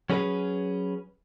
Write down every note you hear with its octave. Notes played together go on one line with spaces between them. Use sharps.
F#3 C#4 G#4 B4